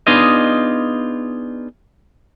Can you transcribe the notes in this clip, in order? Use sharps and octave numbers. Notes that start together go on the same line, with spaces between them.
B3 D4 D#4 F4 G#4 D#5